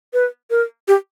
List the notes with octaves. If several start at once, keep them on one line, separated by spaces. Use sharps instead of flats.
B4
A#4
G4